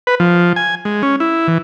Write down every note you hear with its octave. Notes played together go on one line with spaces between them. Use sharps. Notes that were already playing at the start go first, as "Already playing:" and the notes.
B4
F3
G#5
G#3
C#4
E4
E3